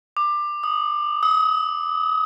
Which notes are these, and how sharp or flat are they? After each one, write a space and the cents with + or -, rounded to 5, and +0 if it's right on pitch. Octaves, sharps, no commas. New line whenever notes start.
D6 +20
D#6 -10
D#6 +40